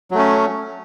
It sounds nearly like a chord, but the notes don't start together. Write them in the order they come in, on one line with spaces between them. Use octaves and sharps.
F#3 A3 C#4